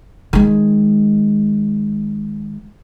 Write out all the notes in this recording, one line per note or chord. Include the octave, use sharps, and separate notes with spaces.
D#3 G#3